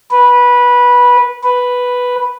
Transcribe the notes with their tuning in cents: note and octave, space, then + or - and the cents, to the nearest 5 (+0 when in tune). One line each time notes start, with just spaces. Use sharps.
B4 -15
B4 +0